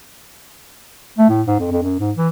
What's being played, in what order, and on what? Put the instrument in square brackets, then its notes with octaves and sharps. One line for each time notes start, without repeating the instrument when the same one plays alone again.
[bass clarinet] A3
A2
G#2
F2
F2
F#2
G#2
E3